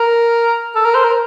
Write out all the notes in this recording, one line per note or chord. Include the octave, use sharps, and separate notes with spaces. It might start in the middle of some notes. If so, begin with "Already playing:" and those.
Already playing: A#4
A4
A#4
C5
A#4